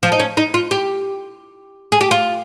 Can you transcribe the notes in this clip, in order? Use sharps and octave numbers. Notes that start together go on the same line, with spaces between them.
F3
D#4
C#4
D#4
F4
G4
G#4
G4
F4